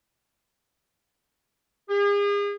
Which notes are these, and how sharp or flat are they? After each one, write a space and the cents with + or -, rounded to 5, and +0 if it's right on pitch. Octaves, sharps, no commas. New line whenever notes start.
G#4 -40